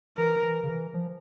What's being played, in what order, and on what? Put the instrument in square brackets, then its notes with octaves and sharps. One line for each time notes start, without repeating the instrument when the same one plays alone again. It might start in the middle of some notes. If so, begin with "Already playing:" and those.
[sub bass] E3 [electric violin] A#4
[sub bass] E3
C#3
E3
F3